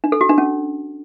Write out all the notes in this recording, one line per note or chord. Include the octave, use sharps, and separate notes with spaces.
D4
A4
F#4
D4
C#4